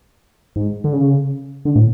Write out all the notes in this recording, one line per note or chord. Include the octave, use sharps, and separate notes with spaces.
G#2
D3
C#3
D3
A2